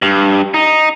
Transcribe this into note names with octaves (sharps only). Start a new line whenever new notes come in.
G2
D#4